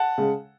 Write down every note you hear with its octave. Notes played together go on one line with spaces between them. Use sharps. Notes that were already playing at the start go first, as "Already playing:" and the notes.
Already playing: F#5 A5
C#3 G#3